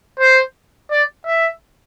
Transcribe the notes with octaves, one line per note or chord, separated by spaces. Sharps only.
C5
D5
E5